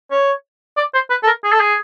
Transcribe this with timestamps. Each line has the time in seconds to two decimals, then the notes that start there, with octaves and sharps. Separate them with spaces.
0.11 C#5
0.77 D5
0.94 C5
1.10 B4
1.23 A4
1.27 A#4
1.44 G#4
1.52 A4
1.60 G#4